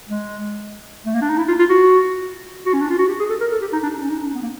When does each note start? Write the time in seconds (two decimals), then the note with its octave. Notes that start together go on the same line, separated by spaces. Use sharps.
0.09 G#3
1.06 A3
1.14 A#3
1.22 D4
1.29 D#4
1.38 E4
1.48 F4
1.59 F4
1.70 F#4
2.66 F#4
2.74 C#4
2.81 D4
2.90 F4
2.98 F#4
3.08 G4
3.19 G#4
3.30 A4
3.41 A#4
3.52 A4
3.61 G4
3.72 D#4
3.83 D4
3.98 D4
4.02 C#4
4.10 D#4
4.18 D4
4.26 C#4
4.35 B3
4.42 A#3